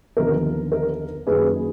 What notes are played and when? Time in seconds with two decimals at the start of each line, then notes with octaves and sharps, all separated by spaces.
0.16 D#2 D3 F3 B3 A#4
0.72 A#4
1.26 F#2 D#3 A#3 G#4 B4